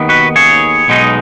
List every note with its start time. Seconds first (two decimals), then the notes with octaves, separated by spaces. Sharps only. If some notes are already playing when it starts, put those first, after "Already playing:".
Already playing: D#2 D#3 B3
0.09 F#4 B4
0.36 G#4 C#5
0.88 B1 B2 G#3 D#4